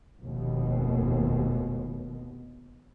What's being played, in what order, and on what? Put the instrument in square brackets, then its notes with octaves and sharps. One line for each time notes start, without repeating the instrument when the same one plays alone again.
[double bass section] F1 D#2 B2